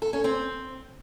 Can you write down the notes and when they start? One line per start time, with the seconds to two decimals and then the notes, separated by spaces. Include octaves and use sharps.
0.02 A4
0.13 C#4
0.24 C4